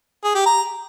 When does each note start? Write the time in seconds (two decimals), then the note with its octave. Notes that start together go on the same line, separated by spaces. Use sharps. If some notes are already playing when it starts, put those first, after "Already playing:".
0.24 G#4
0.35 G4
0.46 A#5